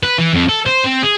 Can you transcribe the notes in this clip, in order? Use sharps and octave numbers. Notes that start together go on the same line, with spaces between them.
B4
E3
F2
A4
C5
C4
G#4